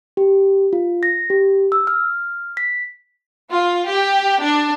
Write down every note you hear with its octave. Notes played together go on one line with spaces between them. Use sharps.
G4
F4
A#6
G4
E6
F6
B6
F4
G4
D4